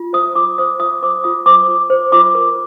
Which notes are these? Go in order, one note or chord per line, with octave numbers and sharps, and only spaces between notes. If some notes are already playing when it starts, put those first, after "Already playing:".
Already playing: F4
C5 D#6
F4 D6
C5 D#6
F4 D#6
C5 D6
F4 D#6
C5 D6
F4
C5
F4 D6
A#4